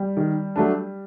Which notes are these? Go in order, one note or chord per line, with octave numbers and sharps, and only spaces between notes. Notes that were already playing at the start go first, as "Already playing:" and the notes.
Already playing: G3
D#3
F#3 A3 D4